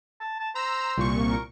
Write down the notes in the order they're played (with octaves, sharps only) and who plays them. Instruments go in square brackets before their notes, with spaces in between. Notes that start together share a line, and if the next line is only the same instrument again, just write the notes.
[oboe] A5
A5
[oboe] C5 [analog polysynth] A#5 E6
[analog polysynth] C2 A#2 C#6
[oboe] A#4